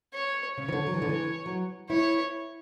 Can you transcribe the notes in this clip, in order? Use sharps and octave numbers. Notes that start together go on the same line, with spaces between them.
C#5
C#3 C#5
E3
D3
F#3
E3
D3
E3
F#3
E4 C#5